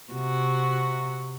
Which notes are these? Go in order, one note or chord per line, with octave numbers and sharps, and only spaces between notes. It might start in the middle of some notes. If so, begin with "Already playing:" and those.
C3 F#4